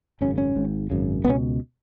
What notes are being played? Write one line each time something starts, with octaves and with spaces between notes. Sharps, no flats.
G#1 F#2 C#3 C#4
C#4
G#1 G#2
G#1 F#2 C#3
C#2 B2 B3 C#4